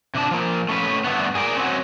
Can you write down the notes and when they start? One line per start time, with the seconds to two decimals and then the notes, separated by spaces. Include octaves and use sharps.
0.15 C3 D4 A5
0.31 F3 A#3
0.69 A3 C#4 B4
1.04 G2 D3 A3 B3
1.35 G#4 A#4 D5
1.55 F#3 C4 C#4